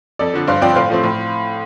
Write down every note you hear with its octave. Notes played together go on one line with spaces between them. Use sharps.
F2 A4 D5
D3 F3
G2 C5 F5
F3 C4 D5 G5
A2 C5 F5
F3 A3 C4
A2